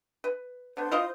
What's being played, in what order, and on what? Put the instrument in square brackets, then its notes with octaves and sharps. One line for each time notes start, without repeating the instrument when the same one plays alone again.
[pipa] B4
[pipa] D3 B3 [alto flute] C5
[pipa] E4 F4 D#5